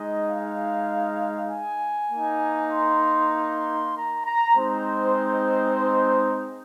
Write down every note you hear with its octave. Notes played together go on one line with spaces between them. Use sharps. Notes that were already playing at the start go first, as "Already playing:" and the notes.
Already playing: G#3 D#4 D#5
F5
G#5
A#3 D#4
C6
C6
A#5
A#5
G#3 C4 D#4 C5